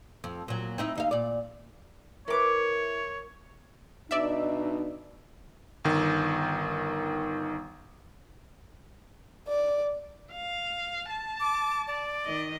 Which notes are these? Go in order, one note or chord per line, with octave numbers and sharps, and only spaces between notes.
F2
A#2 F#3
C4 D#4 E4
D#2 D#4 F5
A#2 D5
E4 A#4 B4 C#5 D6
B2 D4 D#4 D5 E5
G1 D#3
D5
F5
A5
D6
D5
D#3 D#5